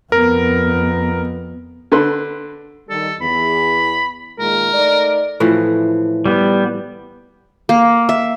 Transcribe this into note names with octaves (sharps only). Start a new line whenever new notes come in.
F2 B3 A#4
D3 B4 C6
D#3 G3 A4
E2 B5
A#2 D#3 G#3 A#4
A3 D#4 D5
A2 E3 F3
G3 B3
A#3
E5